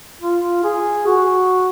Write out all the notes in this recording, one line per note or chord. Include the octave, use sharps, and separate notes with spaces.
F4
G#4
F#4